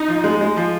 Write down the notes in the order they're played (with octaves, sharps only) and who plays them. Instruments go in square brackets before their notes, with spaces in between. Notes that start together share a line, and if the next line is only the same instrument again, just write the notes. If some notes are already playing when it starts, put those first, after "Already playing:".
Already playing: [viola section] D#4
[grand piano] F3
G#3
G#3
F3